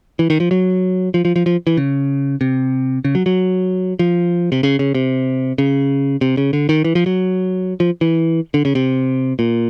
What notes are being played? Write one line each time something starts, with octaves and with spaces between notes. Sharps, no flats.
E3
D#3
F3
F#3
F3
F3
F3
F3
E3
C#3
C3
C#3
F#3
F#3
F3
C3
C#3
C#3
C3
C#3
C3
C#3
D3
D#3
E3
F3
F#3
F3
E3
D3
C#3
C3
A#2